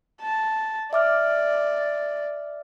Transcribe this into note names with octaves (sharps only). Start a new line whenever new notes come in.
A5
D5 E5 D6 F6